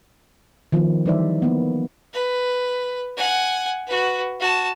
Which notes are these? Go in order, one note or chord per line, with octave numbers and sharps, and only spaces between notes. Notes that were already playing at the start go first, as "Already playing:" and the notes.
D#3 F3 B3
E3 G3 D#4 C5 D5 E5
A#3 B3
B4
F#5 G#5
F#4 B4
F#4 A5